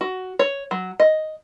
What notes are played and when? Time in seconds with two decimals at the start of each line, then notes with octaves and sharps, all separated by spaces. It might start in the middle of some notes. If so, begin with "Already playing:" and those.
0.01 F#4
0.39 C#5
0.71 F#3
1.00 D#5